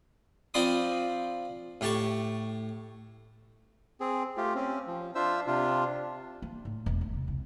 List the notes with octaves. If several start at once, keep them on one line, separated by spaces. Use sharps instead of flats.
F3 C4 D5 B5 C6 D#6
A2 G4 A5 C#6
C4 G#4
A3 F4 G4
C4 C#4
F3
D4 F4 C5 E5 E6
C3 D4 F4
A#3
A2
E1
D2
C3
C2